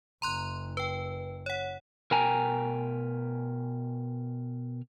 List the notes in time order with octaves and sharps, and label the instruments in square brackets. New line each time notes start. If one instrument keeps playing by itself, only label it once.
[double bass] F#1 [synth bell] A#5 C6 F#6
[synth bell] B4 G5
C#5 F#5
[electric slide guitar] B2 A#4 G5 G#5 A#5